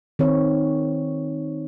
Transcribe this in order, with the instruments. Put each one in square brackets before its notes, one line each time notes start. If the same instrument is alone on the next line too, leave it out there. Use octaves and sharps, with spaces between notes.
[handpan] D#3 C4 C#5